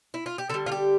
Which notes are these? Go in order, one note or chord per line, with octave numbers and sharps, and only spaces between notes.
E4
F4
G4
D3 G3 A4
F4
G4